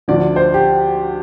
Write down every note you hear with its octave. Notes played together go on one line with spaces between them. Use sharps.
D2 D3 F3 D5
C5
G4